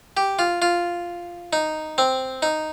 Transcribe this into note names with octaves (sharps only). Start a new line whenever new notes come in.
G4
F4
F4
D#4
C4
D#4